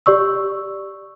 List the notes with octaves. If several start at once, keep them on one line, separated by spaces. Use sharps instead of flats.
G4 D5 C#6 E6